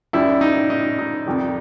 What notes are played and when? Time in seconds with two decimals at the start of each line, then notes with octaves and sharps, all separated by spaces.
0.13 F#2 D#3 G3 E4
0.41 D#4
0.70 D#4
0.99 D#4
1.26 F2 C3 D#3 G3